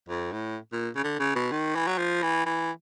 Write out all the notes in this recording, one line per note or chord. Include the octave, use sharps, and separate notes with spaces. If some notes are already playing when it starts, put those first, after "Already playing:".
F2
A2
A#2
C#3
D3
C#3
B2
D#3
E3
F#3
F3
E3
E3